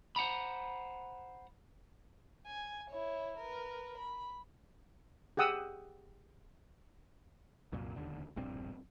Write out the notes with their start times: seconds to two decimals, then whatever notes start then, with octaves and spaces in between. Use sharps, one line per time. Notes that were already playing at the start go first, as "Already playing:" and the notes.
0.16 C5 F#5 A#5 B5
2.47 G#5
2.90 E4 C#5
3.37 A#4 B4
3.97 B5
5.37 G4 G#4 F#5 D#6 E6
7.72 C2 F#2 A#2
7.96 E1 A#1 D#2 D3
8.36 E1 A#1 G2 C4